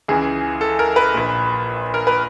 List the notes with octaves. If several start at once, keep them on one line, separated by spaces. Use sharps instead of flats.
C#2 C#3 E3 G#4
A4
A#4
B4
A#1 A#2
A#4
B4